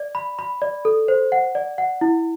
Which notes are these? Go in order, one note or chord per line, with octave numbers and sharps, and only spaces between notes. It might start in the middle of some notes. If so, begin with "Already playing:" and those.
Already playing: D5
B5
B5
D5
A4
C5
F#5
D5
F#5
E4